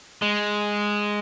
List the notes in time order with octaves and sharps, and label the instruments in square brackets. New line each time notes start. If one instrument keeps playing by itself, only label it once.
[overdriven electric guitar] G#3